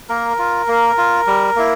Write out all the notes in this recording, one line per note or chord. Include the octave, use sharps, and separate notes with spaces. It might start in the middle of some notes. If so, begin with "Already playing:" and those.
A#3 A#4
F4
A#3
F4
G3
A#3 E4